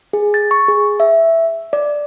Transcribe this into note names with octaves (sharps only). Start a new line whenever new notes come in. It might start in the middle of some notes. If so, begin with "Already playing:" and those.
G#4
A6
C#6
G#4
E5
D5